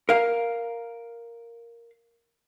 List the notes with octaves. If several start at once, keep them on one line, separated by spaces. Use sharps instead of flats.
A#4 F5